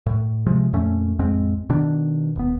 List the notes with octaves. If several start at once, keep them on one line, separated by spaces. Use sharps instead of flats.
A2
C3 F3 G#3
F2 A#2 A3 C#4
A1 F2 G#3 C4
B2 D#3 D4
D#1 B3